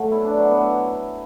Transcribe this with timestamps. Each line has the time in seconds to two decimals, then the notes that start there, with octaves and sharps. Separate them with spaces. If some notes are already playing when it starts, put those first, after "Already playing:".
Already playing: F#3 A3
0.12 B2 E4
0.25 D4
0.37 F#3
0.51 B3